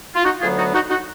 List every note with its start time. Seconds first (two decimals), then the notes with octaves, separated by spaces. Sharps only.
0.15 F4
0.24 D#4 F#4
0.40 D2 D3 F#3 B3 F4 G#4
0.57 D#4 F#4
0.73 D#4 F#4
0.89 D#4 F#4